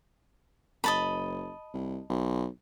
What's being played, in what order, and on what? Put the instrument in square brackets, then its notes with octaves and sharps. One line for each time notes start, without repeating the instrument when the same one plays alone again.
[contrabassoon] F#1 [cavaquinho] D#5 A5 B5
[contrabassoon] C2
B1